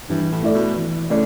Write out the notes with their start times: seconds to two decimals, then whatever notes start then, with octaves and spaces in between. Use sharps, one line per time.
0.09 G2 E3
0.32 A2
0.43 A3 E4 A4 D5
0.54 B2
0.76 E3
1.10 C#3 A3 E4 D5